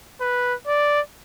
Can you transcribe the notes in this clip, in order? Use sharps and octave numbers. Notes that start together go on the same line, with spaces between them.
B4
D5